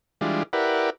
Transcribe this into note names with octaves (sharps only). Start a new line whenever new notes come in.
E3 G3 G#3 D4 F4
E4 G4 A#4 B4 D5 F#5